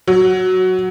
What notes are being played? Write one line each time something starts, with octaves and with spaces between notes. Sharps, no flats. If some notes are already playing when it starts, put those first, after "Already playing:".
F#3